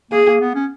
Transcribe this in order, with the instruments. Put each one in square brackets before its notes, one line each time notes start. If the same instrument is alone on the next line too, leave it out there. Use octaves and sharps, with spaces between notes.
[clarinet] A#3 [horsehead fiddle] G#4
[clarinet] A#3
B3
C#4